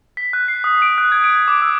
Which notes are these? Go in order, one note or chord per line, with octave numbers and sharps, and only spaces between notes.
B6
F#6
C7
D#6
D7
F#6
G#6
D7
D6
E6